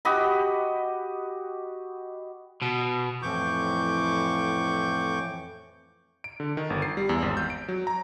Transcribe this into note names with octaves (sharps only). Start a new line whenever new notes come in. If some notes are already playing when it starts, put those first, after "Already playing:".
F#4 G4 D#5 B5
B2
F2 A2 E3 C#6 D6 G6
D7
D3
D#3
G1
C7
G3
E2
G#1
G6
D7
F#3
A#5